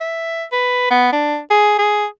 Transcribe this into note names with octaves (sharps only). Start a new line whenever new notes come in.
E5
B4
B3
D4
G#4
G#4